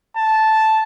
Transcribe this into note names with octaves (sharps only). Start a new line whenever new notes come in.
A5